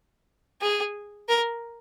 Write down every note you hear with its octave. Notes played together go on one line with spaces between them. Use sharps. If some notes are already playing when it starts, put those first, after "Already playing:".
G#4
A#4